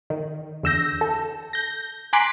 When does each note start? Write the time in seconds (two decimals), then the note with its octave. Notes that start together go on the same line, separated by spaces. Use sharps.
0.10 D#3
0.63 E2 D3 E6 G6 A#6
1.01 A4
1.53 G6 A#6
2.13 G#5 A#5 C6 D6 F#6 B6